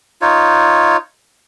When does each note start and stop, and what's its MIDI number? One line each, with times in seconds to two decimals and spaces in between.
0.22 0.97 63
0.22 0.97 65
0.22 0.97 73